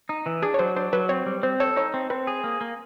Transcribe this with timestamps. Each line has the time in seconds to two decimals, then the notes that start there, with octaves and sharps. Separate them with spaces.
0.09 D#4
0.26 E3
0.42 D4 G#4
0.54 C#5
0.59 F#3 C5
0.76 D4 C5
0.93 F#3 B4
1.09 C4 C#5
1.26 G3
1.43 C4 C5
1.60 A4 C#5
1.76 D#4 C#5
1.94 C4
2.10 C4 B4
2.27 G#4
2.44 A#3
2.61 A#3